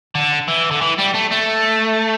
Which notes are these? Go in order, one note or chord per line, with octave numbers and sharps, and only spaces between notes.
D3
E3
D3
E3
G3
A3
A3